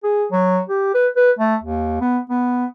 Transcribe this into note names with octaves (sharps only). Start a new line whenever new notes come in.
G#4
F#3
G4
B4
B4
A3
D#2
B3
B3